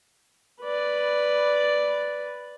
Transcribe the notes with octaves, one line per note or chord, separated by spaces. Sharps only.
B4 D5